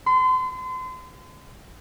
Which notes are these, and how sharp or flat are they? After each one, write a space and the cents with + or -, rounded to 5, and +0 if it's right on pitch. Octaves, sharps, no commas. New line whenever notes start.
C6 -35